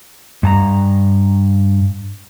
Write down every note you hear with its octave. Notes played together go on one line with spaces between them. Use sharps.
G2 A5 A#5